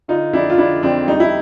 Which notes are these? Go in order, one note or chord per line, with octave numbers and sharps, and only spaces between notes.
D3 D#4 F4
F2 D4 E4
F4
D3 D4 E4
F2 C4 D4
G3 D#4
E4